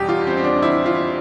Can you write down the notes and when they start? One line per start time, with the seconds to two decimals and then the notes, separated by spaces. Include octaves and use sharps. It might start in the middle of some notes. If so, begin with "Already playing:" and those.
Already playing: E2 B2 G3 G4
0.09 F4
0.27 C4
0.37 C4
0.44 D4
0.62 E4
0.86 F4